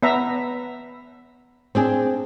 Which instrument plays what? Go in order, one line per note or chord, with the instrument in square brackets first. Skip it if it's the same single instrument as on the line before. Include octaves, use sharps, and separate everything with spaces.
[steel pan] B3 E5 A#5
[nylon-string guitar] C4 D4 G#4